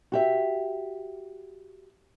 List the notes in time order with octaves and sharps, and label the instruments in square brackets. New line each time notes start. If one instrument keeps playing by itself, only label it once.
[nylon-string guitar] F#4 G4 E5